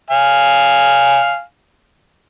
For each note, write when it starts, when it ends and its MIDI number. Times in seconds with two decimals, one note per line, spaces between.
0.10 1.41 77
0.10 1.41 80